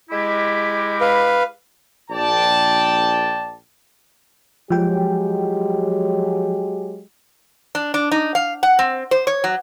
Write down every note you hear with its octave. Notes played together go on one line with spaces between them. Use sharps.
G#3 E4 G4
B4 F5
A#1 D5 G5 A5
F3 F#3 G#3 G4 G5
D4
D4
D#4
F5
F#5
C4
C5
C#5
F#3